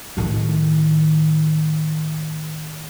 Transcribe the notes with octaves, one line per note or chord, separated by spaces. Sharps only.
A2 D#3